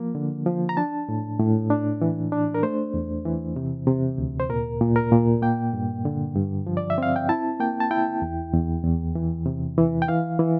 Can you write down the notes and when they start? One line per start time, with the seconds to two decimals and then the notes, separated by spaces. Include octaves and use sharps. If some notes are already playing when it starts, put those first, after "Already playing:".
Already playing: F3 A#3
0.15 D3
0.46 F3
0.69 A#5
0.77 D4 A5
1.09 A2
1.39 A2
1.70 D4
2.01 E3
2.32 D4
2.54 A#4
2.63 A3 C5
2.94 E2
3.25 E3
3.56 C3
3.87 C3
4.18 D2
4.40 C5
4.49 A#2 A#4
4.81 A#2
4.96 A#4
5.12 A#2
5.42 A#3 G5
5.73 G2
6.05 D3
6.36 G2
6.66 F3
6.77 D5
6.90 E5
6.98 C4 F5
7.16 G5
7.29 E4 A5
7.60 A#3 G5
7.80 A5
7.91 E4 G5
8.22 E2
8.54 E2
8.84 E2
9.15 E3
9.46 C3
9.78 E3
10.02 G5
10.08 E3 F5
10.39 E3